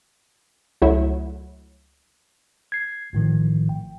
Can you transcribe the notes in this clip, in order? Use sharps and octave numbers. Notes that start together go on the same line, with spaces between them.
C#2 F#3 A3 E4
G#6 C7
G#1 A2 D#3 F3
G5